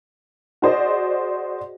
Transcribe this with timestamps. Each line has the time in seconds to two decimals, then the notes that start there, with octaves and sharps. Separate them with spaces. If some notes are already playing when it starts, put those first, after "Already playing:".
0.62 F#4 G#4 C5 D5 D#5